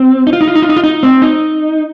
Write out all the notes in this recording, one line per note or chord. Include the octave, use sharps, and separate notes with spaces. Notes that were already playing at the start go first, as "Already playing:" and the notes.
Already playing: C4
D#4
F4
D#4
F4
D#4
F4
D#4
F4
D#4
C4
D#4